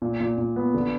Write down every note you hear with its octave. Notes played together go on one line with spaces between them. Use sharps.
A#2
A#2
A#2
B3
D3